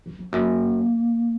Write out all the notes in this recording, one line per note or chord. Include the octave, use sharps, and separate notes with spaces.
E2
F2
F#2 A#3